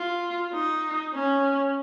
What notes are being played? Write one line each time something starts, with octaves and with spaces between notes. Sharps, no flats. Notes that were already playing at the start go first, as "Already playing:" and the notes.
Already playing: F4
D#4
C#4